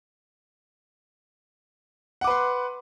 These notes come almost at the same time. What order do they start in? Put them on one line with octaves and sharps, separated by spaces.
F#5 D6 B4 C6